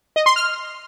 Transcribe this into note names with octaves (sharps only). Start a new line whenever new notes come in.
D#5
C6
F6